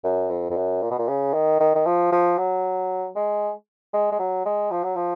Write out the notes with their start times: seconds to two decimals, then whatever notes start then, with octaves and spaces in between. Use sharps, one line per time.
0.04 F#2
0.30 F2
0.50 F2
0.56 F#2
0.82 A#2
0.91 B2
0.99 A#2
1.08 C#3
1.34 D#3
1.60 D#3
1.75 D#3
1.86 F3
2.12 F3
2.38 F#3
3.16 G#3
3.94 G#3
4.12 G#3
4.19 F#3
4.45 G#3
4.71 F3
4.84 F#3
4.96 F3